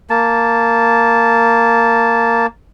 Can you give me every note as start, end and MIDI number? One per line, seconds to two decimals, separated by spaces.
0.10 2.46 58
0.10 2.46 81